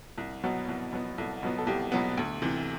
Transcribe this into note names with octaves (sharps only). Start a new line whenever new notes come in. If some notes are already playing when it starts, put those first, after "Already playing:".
C2
B2 F#3 B3
C2
B2 F#3 B3
C2 A4
B2 F#3 B3
A4
C2 G4
B2 F#3 B3
D2
C3 E3